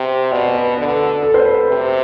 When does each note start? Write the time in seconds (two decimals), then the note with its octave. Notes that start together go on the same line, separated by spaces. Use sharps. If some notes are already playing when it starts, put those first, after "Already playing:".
Already playing: C3
0.31 B2 D5
0.55 B4
0.77 D3 B4
0.92 A4
1.23 A4
1.34 C5
1.44 B4
1.68 C3